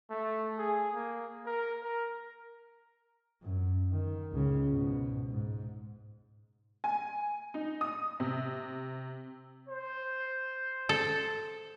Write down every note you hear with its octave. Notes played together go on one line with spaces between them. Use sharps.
A3
G#4
A#3
A#4
A#4
F#2
D#3
C#2 C#3
G#2 B2
G#2
G#5
D#4
D#6
C3
C5
A4